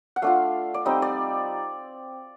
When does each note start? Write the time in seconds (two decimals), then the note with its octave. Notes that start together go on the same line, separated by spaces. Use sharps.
0.16 F#5
0.22 A3 D4 F4 F5
0.74 D5
0.85 G3 C4 D#4 D#5
1.02 D5